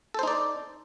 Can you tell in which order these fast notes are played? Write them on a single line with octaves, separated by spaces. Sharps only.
A4 C5 D#4 D5